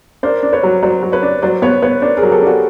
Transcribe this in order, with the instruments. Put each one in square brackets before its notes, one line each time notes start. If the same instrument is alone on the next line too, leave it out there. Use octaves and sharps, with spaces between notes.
[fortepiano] D4 [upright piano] A#4 C5
[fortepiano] D4
[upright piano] B4 C#5
[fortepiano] F#3
[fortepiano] F#3 [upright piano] C5 D5
[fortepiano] F#3
[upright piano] B4 C#5
[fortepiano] D4
[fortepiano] F#3 [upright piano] C5 D5
[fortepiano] B3 [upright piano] B4 C#5
[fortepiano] B3 [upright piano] B4 C#5
[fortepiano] D4 [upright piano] A#4 C5
[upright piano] G#4 A#4
[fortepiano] F#3
[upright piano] G4 A4
[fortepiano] D4
[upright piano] F#4 G#4